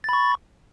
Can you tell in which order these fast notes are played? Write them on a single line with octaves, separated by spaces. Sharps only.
A6 B5 C#6